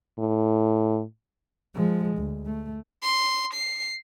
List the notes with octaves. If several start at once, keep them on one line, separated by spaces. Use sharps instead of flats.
A2
F3 G#3
D2
A3
C6
C7